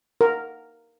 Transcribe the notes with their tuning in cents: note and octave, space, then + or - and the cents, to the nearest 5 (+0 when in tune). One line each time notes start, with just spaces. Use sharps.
A#4 -5